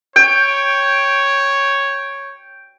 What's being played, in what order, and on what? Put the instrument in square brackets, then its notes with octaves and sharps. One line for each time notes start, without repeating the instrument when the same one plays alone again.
[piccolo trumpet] C#5 [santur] G5